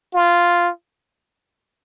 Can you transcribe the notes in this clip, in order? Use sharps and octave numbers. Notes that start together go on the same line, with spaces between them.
F4